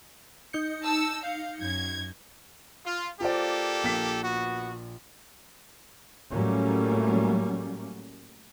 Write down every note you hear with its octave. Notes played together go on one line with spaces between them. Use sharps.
D#4 G6 C#7
A5 E6
F5
F#2 G#6
F4
A#3 F4 G4 A4 C5 D5
A#1 A#2 B6
B3 F#4
A2 F#3 G3 A3 A#3 C#4